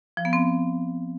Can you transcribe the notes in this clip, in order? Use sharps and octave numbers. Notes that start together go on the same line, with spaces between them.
F3
B3
C4